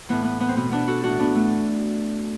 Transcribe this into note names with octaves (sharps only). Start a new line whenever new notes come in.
A2 E3 B3
B3
B3
C4
B2 B3
B3 D4
F#4 A4
A2 E3 D4 F#4
B3 D4
A3